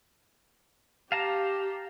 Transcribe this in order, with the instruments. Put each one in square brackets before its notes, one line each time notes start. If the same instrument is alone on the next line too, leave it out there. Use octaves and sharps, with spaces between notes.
[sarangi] G4 [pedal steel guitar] F5 A5 A#5